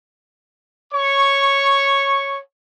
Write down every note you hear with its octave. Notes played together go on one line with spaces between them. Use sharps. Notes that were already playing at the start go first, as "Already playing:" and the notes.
C#5 C#6